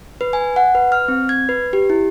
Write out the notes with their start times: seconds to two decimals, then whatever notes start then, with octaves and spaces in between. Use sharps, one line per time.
0.21 B4
0.33 G#5
0.56 F#5
0.75 B4
0.92 F6
1.08 C4
1.29 G#6
1.49 B4
1.73 G4
1.90 E4